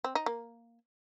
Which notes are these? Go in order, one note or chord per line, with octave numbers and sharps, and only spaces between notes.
C4
D#4
A#3